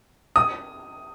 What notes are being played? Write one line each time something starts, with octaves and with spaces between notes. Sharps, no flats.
D#6